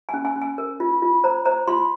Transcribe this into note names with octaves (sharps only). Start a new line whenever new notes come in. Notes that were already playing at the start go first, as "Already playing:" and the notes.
C#4 G#5
G#5
C#4
G#5
A#4
F4
F4
C5 A#5
C5 A#5
F4 C6